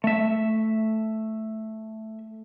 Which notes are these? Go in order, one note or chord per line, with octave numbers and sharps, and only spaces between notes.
A3 E5